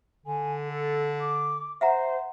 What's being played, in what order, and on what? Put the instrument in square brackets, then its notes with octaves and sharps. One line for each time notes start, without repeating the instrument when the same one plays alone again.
[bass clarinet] D3 [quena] G#5
[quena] A4
D6
[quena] C5 [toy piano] E5 F#5 A#5